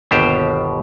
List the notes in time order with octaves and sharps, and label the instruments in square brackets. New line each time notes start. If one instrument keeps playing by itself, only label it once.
[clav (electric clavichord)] G1 D#2 B2 D4 G4 C5